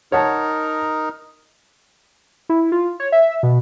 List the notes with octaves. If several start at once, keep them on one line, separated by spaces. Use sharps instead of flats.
D#4 A#4 C#5 F#5 A5
E4
F4
C#5
E5
B2